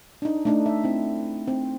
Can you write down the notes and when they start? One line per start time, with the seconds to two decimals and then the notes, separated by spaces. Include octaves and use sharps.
0.22 D4 D#4
0.45 A3 D4 D#4
0.66 E5
0.84 C4 E4
1.48 C4